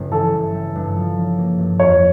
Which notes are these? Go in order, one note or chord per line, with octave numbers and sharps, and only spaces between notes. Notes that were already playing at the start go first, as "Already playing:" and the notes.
Already playing: G1 C#3
E3 A4
G2
G3
G2
F3
C#4
A#3
G2
F2 C#5